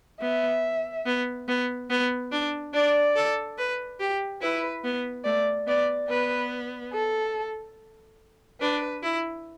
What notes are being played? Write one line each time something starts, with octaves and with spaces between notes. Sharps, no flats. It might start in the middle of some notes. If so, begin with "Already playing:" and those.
B3 E5
B3
B3
B3
D4
D4 D5
A4
B4
G4
E4 B4
B3
A3 D5
B3 D5
B3 B4
A4
D4 B4
E4